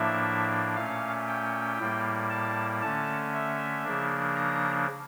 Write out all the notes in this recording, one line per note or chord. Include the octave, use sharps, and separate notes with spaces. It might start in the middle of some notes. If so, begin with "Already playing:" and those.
Already playing: A2 F3 A#3 D4 E5
A#2 A3 C#4 F5
G5
A2 G3 A#3
A5
D3 A3 C#4 A5
E5
C#3 F3 A#3 D4
A#5